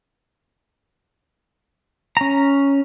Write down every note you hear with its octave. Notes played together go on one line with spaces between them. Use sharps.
C#4 A#5